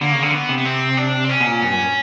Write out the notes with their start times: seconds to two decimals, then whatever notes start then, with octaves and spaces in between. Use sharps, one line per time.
0.01 D3 A#3
0.12 C#3
0.22 D3 C4
0.34 B3
0.49 C3
0.58 B3
0.65 C4
0.97 D4
1.25 C4
1.29 C#4
1.41 B2
1.46 A#2
1.62 G2
1.73 F#2